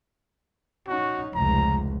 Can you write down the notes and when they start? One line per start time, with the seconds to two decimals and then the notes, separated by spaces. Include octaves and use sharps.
0.88 C#4 D#4 F#4
1.35 F1 C#2 A#5